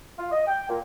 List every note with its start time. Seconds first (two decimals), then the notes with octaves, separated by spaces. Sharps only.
0.18 F4
0.31 D#5
0.47 G5
0.69 A#2